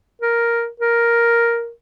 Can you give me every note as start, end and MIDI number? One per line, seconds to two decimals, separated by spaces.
0.22 0.68 70
0.80 1.71 70